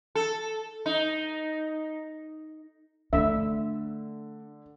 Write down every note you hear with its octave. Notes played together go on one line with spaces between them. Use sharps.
A4
D#4
D3 A3 D4 E5